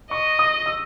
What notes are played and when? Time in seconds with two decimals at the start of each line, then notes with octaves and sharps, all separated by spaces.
0.10 D#5 C#6
0.39 D#6
0.66 E6